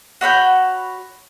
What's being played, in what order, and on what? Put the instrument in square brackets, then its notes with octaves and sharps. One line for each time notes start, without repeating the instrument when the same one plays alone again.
[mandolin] F#4 C#5 B5 G6